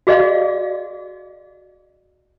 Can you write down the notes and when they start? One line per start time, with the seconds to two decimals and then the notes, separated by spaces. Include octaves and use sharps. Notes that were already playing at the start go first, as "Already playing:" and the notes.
0.07 F#4 G#4 D5 D#5 F5